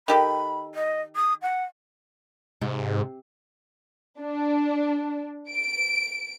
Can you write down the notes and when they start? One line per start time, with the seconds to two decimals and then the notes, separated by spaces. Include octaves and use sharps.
0.08 D#3 G4 A4 B5
0.75 D#5
1.16 D#6
1.42 F#5
2.61 G#2 C3
4.20 D4
5.50 D7